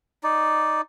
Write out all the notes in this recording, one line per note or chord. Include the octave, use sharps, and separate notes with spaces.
D#4 D5